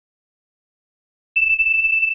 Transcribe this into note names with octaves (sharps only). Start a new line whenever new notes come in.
E7